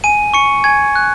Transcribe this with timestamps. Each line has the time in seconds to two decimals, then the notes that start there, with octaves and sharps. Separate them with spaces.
0.04 G#5 D#7
0.34 C#6 C#7
0.64 G#5 G#6
0.95 F#6